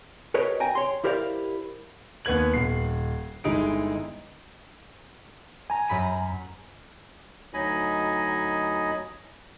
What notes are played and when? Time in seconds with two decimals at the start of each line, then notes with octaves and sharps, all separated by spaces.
0.34 F#4 A#4 B4 C#5 D#5
0.60 G5 G#5 A#5
0.75 C#5 C6
1.04 E4 G4 A#4 C5 D5 F5
2.25 D#2 B3 B4 G#6 F#7
2.54 D#1 C7
3.44 G1 G#3 D#4 E4 G#4 D7
5.70 G#5 A#5
5.88 F#2 B5 D#7
7.54 D2 F#3 D#4 D#5 G#5 B5